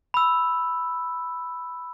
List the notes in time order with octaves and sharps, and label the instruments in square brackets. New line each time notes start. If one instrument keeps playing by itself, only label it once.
[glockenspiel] B5 E6